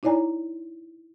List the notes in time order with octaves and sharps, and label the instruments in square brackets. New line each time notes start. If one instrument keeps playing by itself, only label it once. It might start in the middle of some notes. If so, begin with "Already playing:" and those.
[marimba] D#4 E4 C#5 D5 G#5 A#5